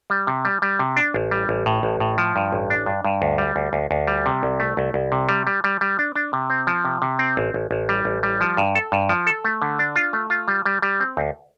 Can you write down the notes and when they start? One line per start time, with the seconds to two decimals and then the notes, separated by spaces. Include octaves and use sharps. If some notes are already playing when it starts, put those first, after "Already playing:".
0.10 G3
0.27 C3
0.45 G3
0.62 G3
0.79 C3
0.97 D4
1.14 A1
1.31 G3
1.49 A1
1.66 A2
1.83 A1
2.00 A2
2.18 F3
2.36 G2
2.52 A1
2.70 D4
2.86 G2
3.04 G2
3.22 D2
3.38 G3
3.56 D2
3.73 D2
3.91 D2
4.07 G3
4.26 C3
4.43 C2
4.60 A3
4.77 C2
4.94 C2
5.12 C3
5.29 G3
5.47 G3
5.64 G3
5.81 G3
5.99 D4
6.16 D4
6.33 C3
6.50 C4
6.67 F3
6.85 C3
7.02 C3
7.19 C4
7.37 A1
7.54 A1
7.71 A1
7.89 G3
8.05 A1
8.23 G3
8.41 F3
8.57 G2
8.75 A4
8.92 G2
9.09 F3
9.27 A4
9.44 A3
9.62 D3
9.79 D4
9.96 F4
10.13 A3
10.30 F4
10.48 G3
10.66 G3
10.82 G3
11.00 C4
11.17 D2